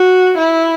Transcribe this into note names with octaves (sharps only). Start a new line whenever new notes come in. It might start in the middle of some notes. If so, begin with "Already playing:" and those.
Already playing: F#4
E4